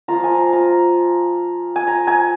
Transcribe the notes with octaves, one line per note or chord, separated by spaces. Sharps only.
F3 A#3 F4 A#5
G#5
A#5
A#5
G#5
A#5
G#5